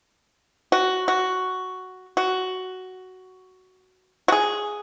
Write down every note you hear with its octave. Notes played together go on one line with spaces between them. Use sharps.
F#4
F#4
F#4
F#4
G#4